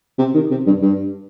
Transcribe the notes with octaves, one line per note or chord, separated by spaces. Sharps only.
C3
D#3
C3
G2
G2